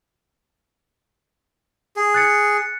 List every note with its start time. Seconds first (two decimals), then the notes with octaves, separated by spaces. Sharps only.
1.96 G#4
2.14 F#6 A6 C#7